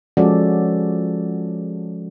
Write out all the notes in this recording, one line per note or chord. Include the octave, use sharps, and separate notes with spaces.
F3 G#3 C#4 F#4 A4 D5